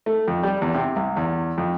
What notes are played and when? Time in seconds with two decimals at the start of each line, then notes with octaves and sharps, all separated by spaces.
0.06 A3
0.28 F2
0.43 G3
0.62 E2
0.74 C3
0.96 C2
1.17 E2
1.58 F2